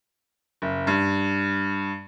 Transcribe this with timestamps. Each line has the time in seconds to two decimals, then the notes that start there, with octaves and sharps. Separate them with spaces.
0.62 F#1
0.87 G2